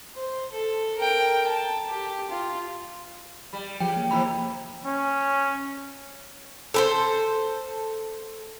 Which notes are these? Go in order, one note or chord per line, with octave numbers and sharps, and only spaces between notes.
C5
A4
A#4 G5
A5
G4
F4
G3 B5
C#3 F3 G4 G5
A#3
F2 C3 E3 A#3 B5
C#4
A4 B4 C5